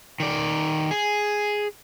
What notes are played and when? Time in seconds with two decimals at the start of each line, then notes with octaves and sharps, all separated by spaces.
0.20 D#3 D5
0.91 G#4